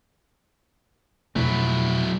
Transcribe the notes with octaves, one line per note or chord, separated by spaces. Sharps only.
F2 B2 F#3 A3 E4